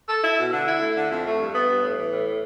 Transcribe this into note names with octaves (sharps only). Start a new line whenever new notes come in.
A4
E4
B2
D3
E4
A3
D3
F2
A3
G2
B3
G2
A2
E3
A2